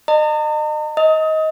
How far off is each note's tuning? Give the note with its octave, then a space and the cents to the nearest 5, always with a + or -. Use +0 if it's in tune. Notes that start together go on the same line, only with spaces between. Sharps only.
D#5 -35 A#5 -45
D#5 +20 D#6 +30